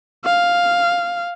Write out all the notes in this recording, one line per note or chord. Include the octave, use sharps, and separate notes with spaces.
F5